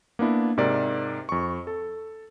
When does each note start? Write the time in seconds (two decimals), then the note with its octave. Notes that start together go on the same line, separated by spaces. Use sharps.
0.19 A#3 B3 D4 E4
0.57 G#2 C3 A#4 D5
1.29 F2 C#6
1.67 A4